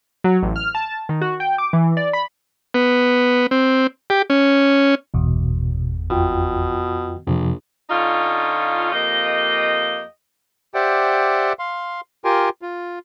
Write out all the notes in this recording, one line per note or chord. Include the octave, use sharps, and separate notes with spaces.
F#3
A1
F6
A5
D#3
F#4
G5
D6
E3
D5
B5
B3
C4
G4
C#4
G1 E2 B2
F2 B2 F4 G5
A#1 F2 C3 F3
D3 C#4 D#4 F4
F2 A#3 G4 D#5
G4 C5 D5 E5 F#5 G5
F5 C6
F4 G4 A#4 G5 G#5 C6
F4